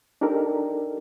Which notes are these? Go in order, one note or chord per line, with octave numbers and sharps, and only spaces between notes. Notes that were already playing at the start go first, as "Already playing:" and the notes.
D4 D#4 G4 A4 A#4